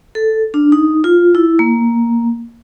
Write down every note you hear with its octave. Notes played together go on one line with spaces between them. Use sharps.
A4
D4
D#4
F4
E4
A#3